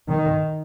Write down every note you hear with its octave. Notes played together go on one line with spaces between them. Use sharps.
D#3